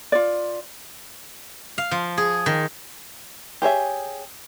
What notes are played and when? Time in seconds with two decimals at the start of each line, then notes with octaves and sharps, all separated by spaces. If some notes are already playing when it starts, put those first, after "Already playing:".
0.12 F4 D5
1.78 F5
1.91 F3
2.18 G#4
2.46 D#3
3.62 G4 G#4 C#5 E5